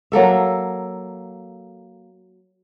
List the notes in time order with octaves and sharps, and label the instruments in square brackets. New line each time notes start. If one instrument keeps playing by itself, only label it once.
[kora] F#3 A#3 A4 E5